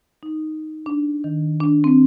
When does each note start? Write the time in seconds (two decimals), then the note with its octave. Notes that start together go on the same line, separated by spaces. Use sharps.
0.23 D#4
0.86 D4
1.24 D#3
1.60 D4
1.84 C4